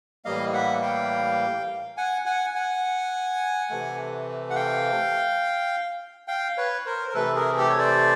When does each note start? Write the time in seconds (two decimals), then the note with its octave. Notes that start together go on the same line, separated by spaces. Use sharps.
0.25 A2 E3 G3 A#3 D#5 F5
0.53 E5 F#5
0.82 F5 G5
1.97 F#5 G#5
2.25 F#5 G#5
2.55 F#5 G#5
3.70 C3 E3 A3
4.50 F#5
4.55 F5 G5
6.28 F5 G5
6.58 B4 C#5
6.86 A#4 C5
7.08 A#4
7.14 C3 E3 A3 A4 B4
7.35 G#4 A#4
7.57 G4 A4
7.69 C#5
7.79 C5 D5